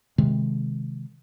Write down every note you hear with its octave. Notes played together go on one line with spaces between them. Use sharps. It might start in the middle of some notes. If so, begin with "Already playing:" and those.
C3 D#3 G#3